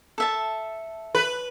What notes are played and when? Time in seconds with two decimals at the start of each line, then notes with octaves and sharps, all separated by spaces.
0.18 A4 E5 A5
1.15 B4